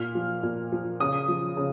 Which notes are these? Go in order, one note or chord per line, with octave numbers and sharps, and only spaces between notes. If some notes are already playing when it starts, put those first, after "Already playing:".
Already playing: A#2 F6
F3
A#2
F3
C#3 D#6
F3
C#3